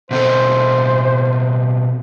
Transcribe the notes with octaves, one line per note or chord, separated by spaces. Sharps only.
B2 C4 A4 C5